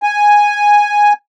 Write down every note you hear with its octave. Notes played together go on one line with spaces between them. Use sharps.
G#5